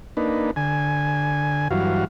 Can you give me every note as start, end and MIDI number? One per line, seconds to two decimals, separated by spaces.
0.17 0.51 58
0.17 0.51 62
0.17 0.51 63
0.17 0.51 71
0.56 1.68 50
0.56 1.68 80
1.71 2.05 43
1.71 2.05 52
1.71 2.05 54
1.71 2.05 66
1.71 2.05 77